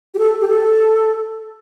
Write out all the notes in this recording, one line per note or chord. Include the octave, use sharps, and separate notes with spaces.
G4
A4
G4
A4